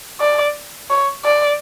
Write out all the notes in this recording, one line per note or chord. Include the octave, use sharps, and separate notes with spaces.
D5
C#5
D5